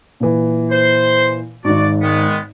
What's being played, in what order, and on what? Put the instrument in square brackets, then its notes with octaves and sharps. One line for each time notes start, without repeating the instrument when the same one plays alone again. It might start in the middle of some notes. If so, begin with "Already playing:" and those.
[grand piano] A#2 E3
[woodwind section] C5
[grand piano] G#1 G#2 [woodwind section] F#4 D5
[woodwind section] D#3 G#3 B3